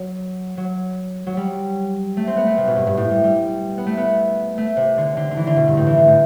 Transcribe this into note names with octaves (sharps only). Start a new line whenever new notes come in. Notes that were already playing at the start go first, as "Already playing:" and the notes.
Already playing: F#3
F#3
F#3
G3
A3
C4
B3
A3
C3
B2
G2
G2
A2
G3
G3
B3
A3
B3
A3
C3
D3
D3
D3
E3
D3
B2
G2
A2
E3
D3
A2